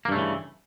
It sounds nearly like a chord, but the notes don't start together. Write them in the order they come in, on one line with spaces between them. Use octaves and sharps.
A#3 G2 A3 C#3 E3